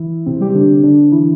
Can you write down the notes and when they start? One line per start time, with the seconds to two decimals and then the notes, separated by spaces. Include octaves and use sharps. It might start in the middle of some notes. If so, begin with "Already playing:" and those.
Already playing: E3 E4
0.26 C3 C4
0.40 G3 G4
0.49 C4
0.55 D3 D4
0.84 D3 D4
1.12 E3 E4